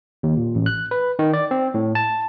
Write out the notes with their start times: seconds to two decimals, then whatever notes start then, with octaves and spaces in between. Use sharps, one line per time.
0.23 D#2
0.37 A#2
0.55 A1
0.66 F#6
0.91 B4
1.19 D#3
1.33 D5
1.51 C4
1.74 A2
1.95 A5